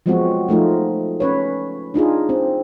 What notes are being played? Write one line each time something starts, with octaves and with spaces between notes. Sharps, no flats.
F3 F#3 G#3 B3 C4 F#4
F3 A3 D#4 F4
C#4 B4 C#5
D4 D#4 F4 G#4
C4